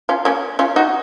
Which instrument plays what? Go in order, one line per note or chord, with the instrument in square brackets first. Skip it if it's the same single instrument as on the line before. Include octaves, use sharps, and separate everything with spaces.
[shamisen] C#4 F4
A#3 C#4
C#4 F4
D#4 F#4